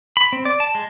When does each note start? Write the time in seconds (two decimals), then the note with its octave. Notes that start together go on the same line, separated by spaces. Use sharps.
0.17 B5
0.33 C4
0.45 D5
0.60 A5
0.75 G#3